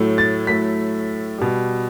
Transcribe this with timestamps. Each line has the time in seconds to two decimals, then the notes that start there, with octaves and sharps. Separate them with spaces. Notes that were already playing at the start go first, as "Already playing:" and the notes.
Already playing: A2 F#3 A3
0.18 A6
0.47 A2 F#3 A3 B6
1.38 B2 G3